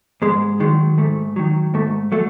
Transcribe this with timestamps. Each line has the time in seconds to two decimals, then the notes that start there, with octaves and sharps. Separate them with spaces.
0.22 G#2 G#3
0.60 D#3 F#3 G#3
0.98 G#2 A3
1.36 D#3 F#3
1.74 G#2 A3
2.12 F#3 A3